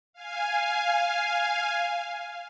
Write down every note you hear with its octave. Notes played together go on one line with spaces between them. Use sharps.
F5 G#5